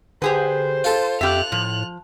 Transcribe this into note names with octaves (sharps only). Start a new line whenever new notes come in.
D3 G4 G#4 B4 C5
F4 A4
F2 G4 E5 F#6 F7
A2 F3